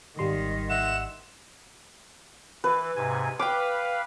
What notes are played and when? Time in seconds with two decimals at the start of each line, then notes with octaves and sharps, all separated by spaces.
0.19 G#1 D#3 G3 C6
0.70 E5 F#5 E7
2.64 E3 B4
2.96 G#2 C3 G#5
3.39 B4 F5 G5 D6